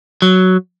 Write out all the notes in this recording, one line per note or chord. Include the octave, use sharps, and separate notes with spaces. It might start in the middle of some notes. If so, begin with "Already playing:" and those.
F#3